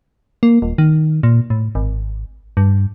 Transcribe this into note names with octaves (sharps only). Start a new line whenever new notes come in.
A#3
D#1
D#3
A#2
A2
G#1
G2